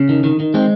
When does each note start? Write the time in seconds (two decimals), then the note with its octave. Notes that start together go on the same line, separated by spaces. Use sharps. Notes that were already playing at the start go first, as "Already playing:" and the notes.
Already playing: C#3 C#4
0.09 D#3
0.24 D#3
0.40 D#3
0.54 G#3 C4